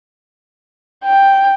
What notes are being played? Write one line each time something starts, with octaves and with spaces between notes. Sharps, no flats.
G5